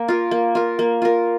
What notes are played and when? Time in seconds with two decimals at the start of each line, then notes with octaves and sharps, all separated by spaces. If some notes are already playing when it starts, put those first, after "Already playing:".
Already playing: A#3
0.08 F4 A#4
0.31 A#3
0.55 F4 A#4
0.79 A#3
1.02 F4 A#4